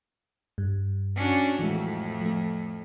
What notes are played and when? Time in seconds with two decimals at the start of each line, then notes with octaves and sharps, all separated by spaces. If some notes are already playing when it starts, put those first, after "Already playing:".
0.58 G2
1.16 C#4 D4 F#4
1.59 F2 A2 E3 G#3
2.21 F3 A3